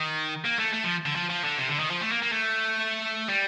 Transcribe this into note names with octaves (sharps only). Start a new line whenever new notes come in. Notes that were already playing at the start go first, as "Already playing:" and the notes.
Already playing: D#3
A#3
A3
A3
F3
D3
F3
F3
D3
C3
D3
D#3
F3
A3
A#3
A#3
A3
G3